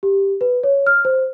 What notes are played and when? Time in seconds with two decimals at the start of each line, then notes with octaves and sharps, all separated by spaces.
0.03 G4
0.41 B4
0.63 C#5
0.87 F6
1.05 C5